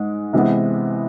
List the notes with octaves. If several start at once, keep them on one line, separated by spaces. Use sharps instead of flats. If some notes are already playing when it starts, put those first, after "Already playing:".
Already playing: G#2 G#3
C3 E3 G#3 B3